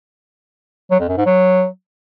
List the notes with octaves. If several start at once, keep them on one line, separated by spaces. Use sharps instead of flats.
F#3
F2
F#2
G#2
F#3